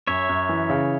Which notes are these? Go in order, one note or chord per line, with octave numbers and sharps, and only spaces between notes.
F#2 C#5 E5
F#2
E3
C#3